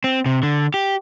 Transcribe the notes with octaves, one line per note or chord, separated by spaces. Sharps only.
C4
C3
D3
G4